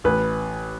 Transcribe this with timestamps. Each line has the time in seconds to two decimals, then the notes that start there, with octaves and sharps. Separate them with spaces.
0.04 A1 B4